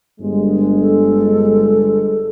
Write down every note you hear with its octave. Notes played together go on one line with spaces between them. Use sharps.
G1 G2 G#3
A4